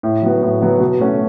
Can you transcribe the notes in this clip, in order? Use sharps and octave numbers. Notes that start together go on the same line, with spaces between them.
A2
F#3 B3 F#4
A2
F#3 B3 F#4
B2
A3 C#4 F#4